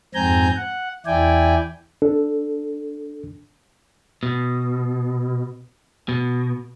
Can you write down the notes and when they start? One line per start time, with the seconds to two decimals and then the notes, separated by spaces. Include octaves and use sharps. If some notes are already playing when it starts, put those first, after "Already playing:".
0.14 F2 G#2 C4 G#5 A#5 G6
0.57 F#5
1.06 E2 E4 D5 G5 G#5
2.02 D4 A4
4.23 B2
6.09 B2